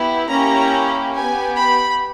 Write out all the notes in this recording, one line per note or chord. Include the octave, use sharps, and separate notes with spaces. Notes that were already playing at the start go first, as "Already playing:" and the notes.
Already playing: B3 E4 G4
A#3 C#4 E4 G4 A#5
B3 G4 G#5
B5